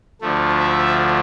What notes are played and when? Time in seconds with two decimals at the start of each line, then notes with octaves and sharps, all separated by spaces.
0.21 D2 D3 F3 A3
0.59 E5